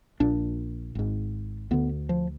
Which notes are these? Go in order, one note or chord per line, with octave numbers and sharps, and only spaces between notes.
A#1 A#2 D4
G#1 G#2
D2 D3 B3
F3